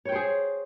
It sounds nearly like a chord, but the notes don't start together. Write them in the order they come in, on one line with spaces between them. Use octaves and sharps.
C#5 G5 C5 G#4